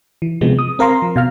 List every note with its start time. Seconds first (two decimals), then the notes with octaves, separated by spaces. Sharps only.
0.22 E3
0.41 C3 F3 G#3 B3
0.59 D#6
0.79 C4 A#4 F5 A#5 C6
1.02 F3
1.16 B2 F5 F6